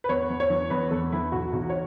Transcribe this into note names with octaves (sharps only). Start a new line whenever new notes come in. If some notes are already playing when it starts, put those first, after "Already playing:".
B4
E2 C#5
E2
C#5
E3
E2 B4
E2 A4
E3 E4
B1 F#4
B1 F#4
C#5